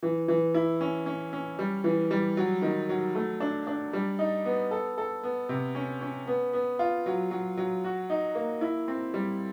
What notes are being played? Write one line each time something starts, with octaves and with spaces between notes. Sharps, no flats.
E3
E3
E4
C#4
C#4
C#4
G3
E3
G3
F#3
D#3
F#3
A3
D4
D4
G3
D#4
B3
A4
A4
B3
C3
C#4
C#4
B3
B3
F4
F#3
F#3
F#3
F#4
D#4
A#3
E4
C4
G3